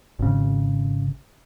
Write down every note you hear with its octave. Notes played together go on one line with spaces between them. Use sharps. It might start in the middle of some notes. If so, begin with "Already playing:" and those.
G#1 C#3